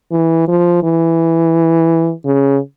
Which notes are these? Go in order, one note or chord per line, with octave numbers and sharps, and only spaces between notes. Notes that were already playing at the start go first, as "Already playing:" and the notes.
E3
F3
E3
C#3